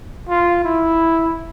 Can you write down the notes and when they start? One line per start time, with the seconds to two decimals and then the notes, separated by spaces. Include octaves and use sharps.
0.29 F4
0.64 E4